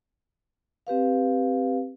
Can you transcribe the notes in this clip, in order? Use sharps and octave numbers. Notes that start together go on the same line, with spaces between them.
C4 G4 B4 F5